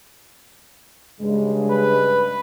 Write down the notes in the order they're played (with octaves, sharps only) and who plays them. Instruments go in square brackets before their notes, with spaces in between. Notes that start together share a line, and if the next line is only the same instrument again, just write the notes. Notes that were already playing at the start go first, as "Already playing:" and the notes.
[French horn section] G2 C#3 G#3
[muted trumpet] B4